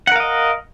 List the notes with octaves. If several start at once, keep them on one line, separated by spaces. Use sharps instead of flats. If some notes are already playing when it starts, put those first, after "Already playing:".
A#4 D#5 F5 F#5